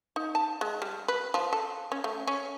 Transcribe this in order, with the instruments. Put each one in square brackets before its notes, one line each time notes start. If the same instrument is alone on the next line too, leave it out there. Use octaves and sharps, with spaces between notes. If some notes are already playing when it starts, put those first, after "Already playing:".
[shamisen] D#4
A5
G#3
G3
B4
F3
A4
C#4
A3
C#4